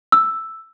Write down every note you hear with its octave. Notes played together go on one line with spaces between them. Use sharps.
E6